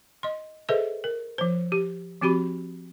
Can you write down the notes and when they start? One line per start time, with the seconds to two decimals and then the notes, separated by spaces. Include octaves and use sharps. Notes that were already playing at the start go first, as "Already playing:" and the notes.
0.23 D#5 C6
0.69 G#4 A4 B4 C5 D#5 E5
1.04 A#4
1.38 F3 C5
1.72 G4
2.21 F3 C4 F#4 G4 B5